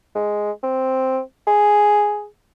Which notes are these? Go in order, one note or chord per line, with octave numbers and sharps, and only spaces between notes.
G#3
C4
G#4